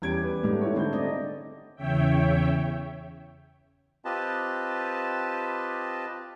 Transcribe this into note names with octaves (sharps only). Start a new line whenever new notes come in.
E2 G3 C#4 G4 G#6 D7
B4
G#2 G3 A3 B3
E4 A4 C#5
D3 G#3 A3 C4 D#4 G6
A3 D5 D#5
E2 C#3 C#5 E5 G5
C4 F4 G4 B4 D#5 A5